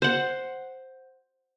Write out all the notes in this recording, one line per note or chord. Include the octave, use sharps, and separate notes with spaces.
C5 F#5